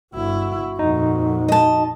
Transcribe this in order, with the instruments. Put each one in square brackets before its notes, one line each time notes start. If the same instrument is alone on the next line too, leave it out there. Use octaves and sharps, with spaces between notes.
[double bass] G1 E4 [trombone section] F#4
[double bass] F2 A#2 [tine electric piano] D#4
[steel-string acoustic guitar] D#5 A5